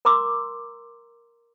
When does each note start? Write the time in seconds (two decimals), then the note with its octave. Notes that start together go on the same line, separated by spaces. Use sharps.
0.05 A#4 A#5 C6 D6 E6